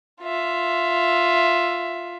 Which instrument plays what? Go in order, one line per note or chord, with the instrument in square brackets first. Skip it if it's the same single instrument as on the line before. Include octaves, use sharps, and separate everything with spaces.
[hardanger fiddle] F4 E5